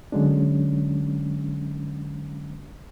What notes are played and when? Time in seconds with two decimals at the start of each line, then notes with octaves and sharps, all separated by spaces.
0.12 D3 F#3 G#3 C#4 D4